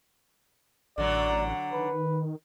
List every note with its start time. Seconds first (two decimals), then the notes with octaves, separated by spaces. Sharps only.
0.98 A1 D3 F#3 D5
1.73 D#3 B4